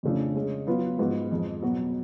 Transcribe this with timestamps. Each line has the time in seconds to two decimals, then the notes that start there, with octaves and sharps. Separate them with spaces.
0.03 F2 C#3 F3 A3 D4
0.35 G#3 C#4 G#4
0.67 F#3 B3 F4 B4
0.99 G#2 F3 B3 F#4 B4
1.31 F2 F3 G#3
1.62 B2 F#3 B3 F#4